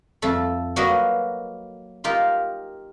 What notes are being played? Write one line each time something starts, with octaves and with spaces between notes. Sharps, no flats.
F2 A3 A4
F#3 A#3 F#4 A#4 B4 D#5
D#4 F4 G4 A#4